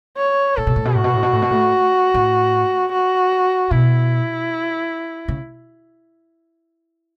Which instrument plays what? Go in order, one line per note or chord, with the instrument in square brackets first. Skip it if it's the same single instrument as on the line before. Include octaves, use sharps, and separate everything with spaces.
[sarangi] C#5
[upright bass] A2 [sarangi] A4
[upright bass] B2
A2
B2
[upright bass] A2 [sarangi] F#4
[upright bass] B2
A2
B2
A2
B2
A2
A2
[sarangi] F#4
[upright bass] B2 [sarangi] E4
[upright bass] C#3